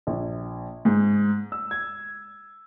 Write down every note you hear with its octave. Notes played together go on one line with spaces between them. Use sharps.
A#1
G#2
E6
G#6